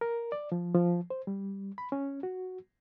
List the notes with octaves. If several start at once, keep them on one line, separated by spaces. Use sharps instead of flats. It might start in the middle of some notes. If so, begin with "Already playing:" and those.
A#4
D5
F3
F3
C5
G3
B5
C#4
F#4